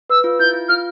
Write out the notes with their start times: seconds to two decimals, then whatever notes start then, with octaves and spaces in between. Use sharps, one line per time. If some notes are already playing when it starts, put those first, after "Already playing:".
0.10 B4 E6
0.24 F4
0.39 E4 G6
0.54 F4
0.68 F4 F6